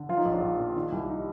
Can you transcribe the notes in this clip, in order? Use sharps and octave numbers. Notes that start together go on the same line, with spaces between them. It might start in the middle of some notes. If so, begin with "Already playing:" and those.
Already playing: D3
F3 F4
D#4
A#1
D4
A#1
A#2
D#3
C2
G3 D#4